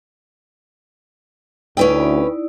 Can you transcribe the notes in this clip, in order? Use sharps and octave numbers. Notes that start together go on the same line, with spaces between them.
D2 C#4 D#4 E4 B4 D5 G5